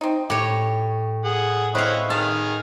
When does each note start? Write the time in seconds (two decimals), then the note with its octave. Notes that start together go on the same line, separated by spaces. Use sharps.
0.01 C4 D#4
0.30 A2 G4 C#5
1.25 G#4 F#5
1.75 C4 E4 B4 C#5 D#5 F5
2.10 D#3 G#4 A5 F6